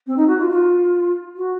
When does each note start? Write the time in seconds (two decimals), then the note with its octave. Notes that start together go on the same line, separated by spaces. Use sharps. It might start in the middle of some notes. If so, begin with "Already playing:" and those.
0.07 C4
0.17 D#4
0.27 F#4
0.39 F4
0.50 F4
1.36 F#4